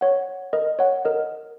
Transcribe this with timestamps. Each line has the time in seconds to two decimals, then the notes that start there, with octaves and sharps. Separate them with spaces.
0.01 C#5 F#5
0.53 A#4 D#5
0.79 C#5 F#5
1.05 A#4 D#5